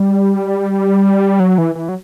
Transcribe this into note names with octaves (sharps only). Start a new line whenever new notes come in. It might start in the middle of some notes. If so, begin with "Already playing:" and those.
Already playing: G3
F#3
E3
E3
F#3